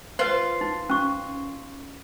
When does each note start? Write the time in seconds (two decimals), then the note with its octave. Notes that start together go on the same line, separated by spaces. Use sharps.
0.19 F4 B4 C5
0.61 D#4
0.90 C#4 C#6